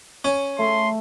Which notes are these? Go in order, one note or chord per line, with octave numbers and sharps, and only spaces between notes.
C#4
A3 C6